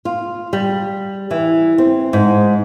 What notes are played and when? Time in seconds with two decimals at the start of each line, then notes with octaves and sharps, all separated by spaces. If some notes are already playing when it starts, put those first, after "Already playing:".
0.05 F4
0.53 G3
1.31 E3
1.78 C4
2.13 G#2